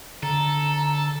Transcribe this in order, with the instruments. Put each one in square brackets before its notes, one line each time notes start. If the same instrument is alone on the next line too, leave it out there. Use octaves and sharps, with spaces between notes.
[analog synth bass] D3 [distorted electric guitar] A4 [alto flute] A#5